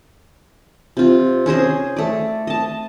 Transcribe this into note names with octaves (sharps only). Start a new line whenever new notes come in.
C3 F4
C#4 G#4 C5 D#5
A3 D5
D#5 A5